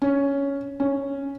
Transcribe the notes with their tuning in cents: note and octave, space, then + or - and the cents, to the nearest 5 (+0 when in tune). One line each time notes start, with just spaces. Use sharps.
C#4 +5
C#4 -5